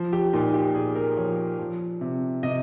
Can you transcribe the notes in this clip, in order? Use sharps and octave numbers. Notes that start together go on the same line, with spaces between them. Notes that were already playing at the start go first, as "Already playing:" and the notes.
Already playing: F3
G4
A#2 D#4
G4
A#2 G#4
A#4
F3 C#5
F3
C3
C3 D#5